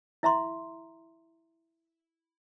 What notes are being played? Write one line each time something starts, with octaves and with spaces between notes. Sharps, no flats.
E4 E5 A#5 C6